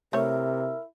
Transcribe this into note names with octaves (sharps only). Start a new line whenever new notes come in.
C3 A3 E4 A#4 C#5